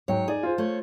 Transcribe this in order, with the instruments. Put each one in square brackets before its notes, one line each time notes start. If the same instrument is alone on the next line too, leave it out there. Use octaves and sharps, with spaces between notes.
[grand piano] G#2 F#3 G5 [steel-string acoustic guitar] C#5
[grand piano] D#4 D5 [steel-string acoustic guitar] G#4
[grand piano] F4 C5
[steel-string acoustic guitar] A3 C#5